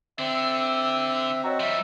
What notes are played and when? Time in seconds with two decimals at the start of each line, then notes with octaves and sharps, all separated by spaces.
0.19 D3 C4 E5
1.44 F#4 C#5 D#5 A#5
1.60 F3 G3 E5